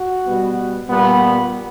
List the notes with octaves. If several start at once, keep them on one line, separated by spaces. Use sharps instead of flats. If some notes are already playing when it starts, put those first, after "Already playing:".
Already playing: F#4
B2 G3 B3
A#2 G3 B3